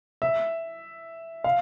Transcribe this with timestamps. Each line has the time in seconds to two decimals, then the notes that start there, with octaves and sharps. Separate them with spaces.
0.22 E5
1.44 F5